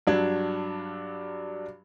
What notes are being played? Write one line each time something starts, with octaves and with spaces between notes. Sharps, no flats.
G2 F#3 D4 G#6